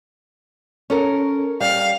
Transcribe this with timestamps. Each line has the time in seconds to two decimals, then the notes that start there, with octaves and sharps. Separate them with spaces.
0.90 C#4 A4 A#4
1.61 G3 F5